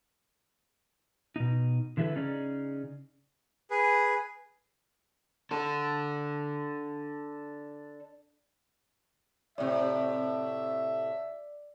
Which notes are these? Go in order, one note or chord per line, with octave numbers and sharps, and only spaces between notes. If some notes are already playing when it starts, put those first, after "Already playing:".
B2 D#4
D3 E3 E4 G4 A4 B4
C#3 C#4 D#4 G#4 D5
G#4 B4
D4 A4
A2 C3 D5 E5